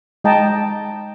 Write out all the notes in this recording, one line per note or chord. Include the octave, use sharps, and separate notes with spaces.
G#3 D#5 G5 A5 A#5